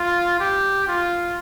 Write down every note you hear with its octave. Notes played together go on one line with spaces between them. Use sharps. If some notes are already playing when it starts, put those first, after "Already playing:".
Already playing: F4
G4
F4